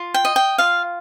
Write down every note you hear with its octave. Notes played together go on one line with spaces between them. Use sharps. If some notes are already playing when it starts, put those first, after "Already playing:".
Already playing: F4
G5
D#5
G5
F4 F5